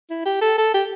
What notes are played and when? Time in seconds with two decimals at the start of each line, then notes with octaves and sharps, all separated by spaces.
0.10 E4
0.26 G4
0.41 A4
0.58 A4
0.74 G4